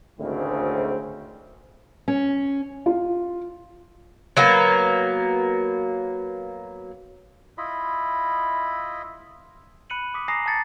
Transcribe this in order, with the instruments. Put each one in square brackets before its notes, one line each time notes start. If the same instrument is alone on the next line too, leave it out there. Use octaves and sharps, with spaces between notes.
[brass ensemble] G#1 D2 A2 C#3 G#3 C4
[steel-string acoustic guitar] C#4
[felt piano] F4
[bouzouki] F#3 A#3 B3
[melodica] E4 F4 D#5 B5
[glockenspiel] B5 F#6 C#7 D#7 F#7
D6 D#6 B6
G#5 A#5 D#6 A#6 C7
A5 D#6 G#6 A6 C#7